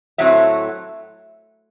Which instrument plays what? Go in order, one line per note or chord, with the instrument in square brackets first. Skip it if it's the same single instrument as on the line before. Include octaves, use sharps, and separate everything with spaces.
[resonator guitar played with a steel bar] A2 F#3 A3 C4 E5